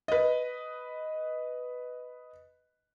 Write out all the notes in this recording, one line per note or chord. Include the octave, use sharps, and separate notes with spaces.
B4 D#5